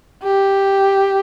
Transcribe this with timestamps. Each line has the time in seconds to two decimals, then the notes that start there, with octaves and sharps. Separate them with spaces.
0.24 G4